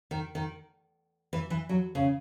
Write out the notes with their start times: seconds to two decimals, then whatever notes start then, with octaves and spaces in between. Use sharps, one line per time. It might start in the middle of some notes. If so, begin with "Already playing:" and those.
0.11 D#3
0.35 D#3
1.33 E3
1.50 E3
1.69 F#3
1.95 C#3